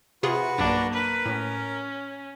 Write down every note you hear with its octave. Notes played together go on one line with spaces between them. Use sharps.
C3 F4 F#4 G#4 B4 C#6
B1 G2 A#3 D4
A#4 B4
A2 C#4